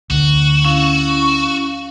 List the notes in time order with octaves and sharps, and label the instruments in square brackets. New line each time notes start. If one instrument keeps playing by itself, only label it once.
[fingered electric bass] D2 D3 [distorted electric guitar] F#4
[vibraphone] C#4 E4 F5 [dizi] C#6